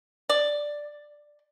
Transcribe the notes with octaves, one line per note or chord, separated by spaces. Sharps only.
D5